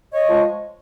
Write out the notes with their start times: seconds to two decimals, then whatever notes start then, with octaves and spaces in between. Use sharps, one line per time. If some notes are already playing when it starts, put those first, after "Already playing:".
0.12 C#5 D#5
0.27 F3 G#3